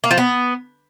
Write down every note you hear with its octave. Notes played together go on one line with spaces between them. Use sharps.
A#3
F3
B3